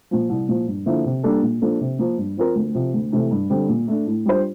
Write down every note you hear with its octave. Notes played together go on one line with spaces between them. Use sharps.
A#2 F3
C2
A#2 F3
G2
D3 F3 A#3 E4
C3
G3 A#3 D4 A4
A#2
F3 A#3 D4 A4
C3
F3 A#3
G2
F3 C4 F4 A#4
D2
C3 F3
D2
C3 E3 A3
G2
D3 G3 C4
A#2
A3 D4
A2
G3 D4 F4 C5